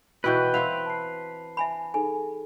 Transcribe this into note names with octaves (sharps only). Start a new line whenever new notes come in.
B2 E3 E4 F#4 B4 G5 G6
C4 E4 F5 F#5 F7
A5 C7
E5 G#5 B5
D#4 G#4 A4 G#5